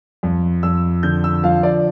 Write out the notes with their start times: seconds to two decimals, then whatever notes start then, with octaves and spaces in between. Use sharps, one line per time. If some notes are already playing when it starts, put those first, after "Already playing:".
0.23 F2
0.63 F2 E6
1.03 D3 G6
1.24 E6
1.43 F3 F5
1.63 D5